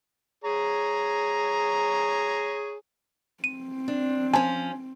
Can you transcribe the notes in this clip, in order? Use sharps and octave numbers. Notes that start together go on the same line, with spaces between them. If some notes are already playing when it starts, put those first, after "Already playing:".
G#4 C#5 A#5
C4 D#7
D4
F3 C#4 G#5 A5